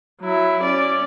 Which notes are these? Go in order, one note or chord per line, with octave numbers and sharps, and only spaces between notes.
F#3 E4
C#4 D5